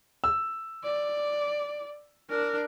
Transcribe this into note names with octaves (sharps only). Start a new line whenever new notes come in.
E6
D5
D4 A#4